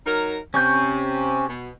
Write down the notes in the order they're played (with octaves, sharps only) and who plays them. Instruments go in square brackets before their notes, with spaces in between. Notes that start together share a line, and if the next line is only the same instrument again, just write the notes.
[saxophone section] F#3 D#4 A#4
[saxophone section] C3 [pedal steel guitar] C#4 C#6 G6
[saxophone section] B2